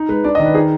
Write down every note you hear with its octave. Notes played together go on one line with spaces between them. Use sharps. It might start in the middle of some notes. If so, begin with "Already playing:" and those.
Already playing: D#4
G#3 B4
D4 D5
D#5
D#3
B4
D#4 G#4